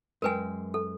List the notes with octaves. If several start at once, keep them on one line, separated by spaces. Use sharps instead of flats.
F#2 G#3 A#4 B4 G5 G#5
A4